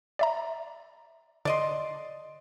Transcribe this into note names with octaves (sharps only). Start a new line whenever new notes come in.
D5 E5 A#5
D3 D5 D#5 C6